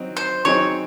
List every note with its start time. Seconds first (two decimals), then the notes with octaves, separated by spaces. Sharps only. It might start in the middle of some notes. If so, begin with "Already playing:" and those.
Already playing: F#3 C4 D#4
0.17 C5
0.45 F#3 C4 D#4 G#4 C#5